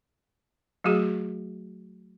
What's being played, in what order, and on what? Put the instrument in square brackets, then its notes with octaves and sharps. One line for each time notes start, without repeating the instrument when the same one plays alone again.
[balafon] F#3 A3 F#4 G#4